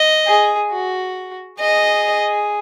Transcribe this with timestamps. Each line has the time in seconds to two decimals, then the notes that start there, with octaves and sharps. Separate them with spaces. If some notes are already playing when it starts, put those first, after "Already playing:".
Already playing: D#5
0.26 G#4
0.71 F#4
1.60 G#4 D#5